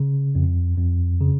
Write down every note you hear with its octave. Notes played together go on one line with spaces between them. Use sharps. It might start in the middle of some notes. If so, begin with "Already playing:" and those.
Already playing: C#3
F2
F2
C#3